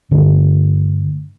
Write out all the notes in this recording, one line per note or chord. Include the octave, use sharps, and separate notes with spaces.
G2 D3 A3